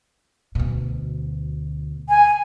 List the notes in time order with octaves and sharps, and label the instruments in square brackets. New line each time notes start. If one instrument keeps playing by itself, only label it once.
[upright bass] D2 B2
[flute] G#5